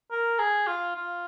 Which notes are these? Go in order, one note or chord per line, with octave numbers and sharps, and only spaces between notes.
A#4
G#4
F4
F4